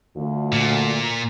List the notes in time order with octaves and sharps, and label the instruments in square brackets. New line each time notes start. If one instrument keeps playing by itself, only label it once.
[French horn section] D2 D3 F4
[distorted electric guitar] A#2